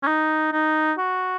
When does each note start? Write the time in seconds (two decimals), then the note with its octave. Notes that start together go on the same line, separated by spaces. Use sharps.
0.03 C#4
0.07 D#4
0.52 D#4
0.98 F#4